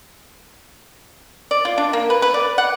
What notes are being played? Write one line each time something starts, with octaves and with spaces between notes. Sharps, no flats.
D5
F4
D4
A#3
B4
B4
D5
F#5